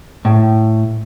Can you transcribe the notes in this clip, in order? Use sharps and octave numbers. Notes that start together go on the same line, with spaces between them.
A2